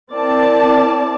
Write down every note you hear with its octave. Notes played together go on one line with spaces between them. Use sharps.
C4 E4 A#4 D5 A5